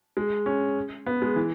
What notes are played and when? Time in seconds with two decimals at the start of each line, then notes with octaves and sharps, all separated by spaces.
0.17 G#3
0.46 C#4
1.06 B3
1.22 G#3
1.36 E3